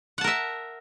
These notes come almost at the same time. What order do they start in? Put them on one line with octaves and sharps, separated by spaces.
F#5 A5 A#4 E5